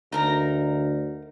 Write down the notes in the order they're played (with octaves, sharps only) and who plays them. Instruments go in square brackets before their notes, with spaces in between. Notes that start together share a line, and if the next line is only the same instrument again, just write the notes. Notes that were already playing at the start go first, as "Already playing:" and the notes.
[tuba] D2 [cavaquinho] D#4 A#4 A#5